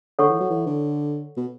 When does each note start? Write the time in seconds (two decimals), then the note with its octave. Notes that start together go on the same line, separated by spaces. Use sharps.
0.19 D3 A4 C#5 F#5 C#6
0.30 E3
0.40 F#3
0.50 E3
0.66 D3
1.37 B2